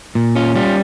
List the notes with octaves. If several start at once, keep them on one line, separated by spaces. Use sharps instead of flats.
A#2
C#4 F4
G3 F4